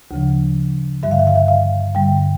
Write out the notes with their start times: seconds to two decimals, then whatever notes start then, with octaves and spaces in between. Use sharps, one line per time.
0.11 D2 C#3 F3
1.03 G2 D3 G3 E5
1.11 F5
1.19 E5
1.27 F5
1.36 E5
1.48 F5
1.94 G2 D3 G3 G5